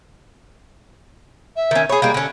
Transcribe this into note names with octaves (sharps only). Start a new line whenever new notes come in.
E5
D#3 C#4
G#4 C#5 B5
G3 G#3 A#3
D3 C#4